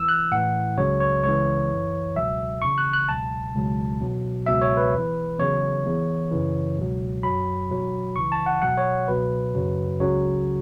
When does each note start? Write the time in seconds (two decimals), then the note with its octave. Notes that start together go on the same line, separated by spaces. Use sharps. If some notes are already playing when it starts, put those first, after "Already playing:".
Already playing: E2 E3 E6
0.09 F#6
0.31 A2 E3 F#5
0.78 C#2 C#3 F#3 C#5
1.00 C#5
1.24 C#2 C#3 E3 C#5
1.70 F#2 E3
2.16 C#2 B2 F#3 E5
2.62 E2 C#3 E3 C#6
2.78 F#6
2.93 F#6
3.09 C#2 B2 F#3 A5
3.55 C#2 B2 F#3
4.00 E2 B2 F#3
4.46 C#2 B2 F#3 E5
4.62 C#5
4.77 B4
4.93 E2 E3
5.39 E2 C#3 F#3 C#5
5.85 E2 E3
6.31 F#2 C#3 E3
6.78 C#2 B2 F#3
7.23 F#2 F#3 B5
7.70 E2 B2 F#3
8.16 C#2 C#3 E3 C#6
8.32 A5
8.46 F#5
8.62 E2 B2 F#3 F#5
8.77 C#5
9.08 C#2 B2 F#3 B4
9.55 F#2 C#3 F#3
10.00 C#2 C#3 F#3 C#5